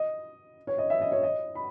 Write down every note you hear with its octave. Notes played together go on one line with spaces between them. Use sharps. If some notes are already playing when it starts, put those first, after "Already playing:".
Already playing: D#5
C#5
D#5
E5
D#5
C#5
D#5
B5